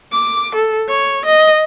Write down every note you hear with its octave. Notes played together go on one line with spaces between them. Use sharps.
D6
A4
C#5
D#5